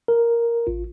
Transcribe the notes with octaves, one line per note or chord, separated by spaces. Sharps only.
A#4
A1 F4